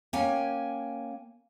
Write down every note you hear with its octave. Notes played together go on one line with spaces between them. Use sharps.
A#3 C#4 G5 G#5